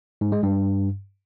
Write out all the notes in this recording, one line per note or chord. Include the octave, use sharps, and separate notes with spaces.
G#2
G#3
G2